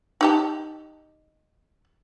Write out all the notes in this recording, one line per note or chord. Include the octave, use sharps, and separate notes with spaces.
D#4 G4 A5